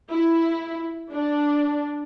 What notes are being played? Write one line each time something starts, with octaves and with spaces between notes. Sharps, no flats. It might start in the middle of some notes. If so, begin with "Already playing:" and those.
E4
D4